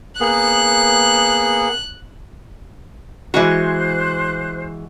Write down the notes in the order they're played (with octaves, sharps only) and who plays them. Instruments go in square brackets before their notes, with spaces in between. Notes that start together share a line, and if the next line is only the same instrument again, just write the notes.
[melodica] A#3 B3 G#4 [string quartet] F#6
[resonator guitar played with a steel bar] E3 G#3 F#4 [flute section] C5 F#6